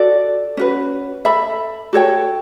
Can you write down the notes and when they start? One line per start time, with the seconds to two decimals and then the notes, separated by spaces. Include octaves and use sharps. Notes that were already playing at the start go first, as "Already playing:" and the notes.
Already playing: F#4 A4 D5
0.57 C#4 F#4 B4
1.25 A4 E5 B5
1.93 F#4 A4 C#5 G5